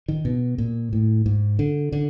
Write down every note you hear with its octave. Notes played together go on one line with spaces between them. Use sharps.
D#3
B2
A#2
A2
G#2
D3
D3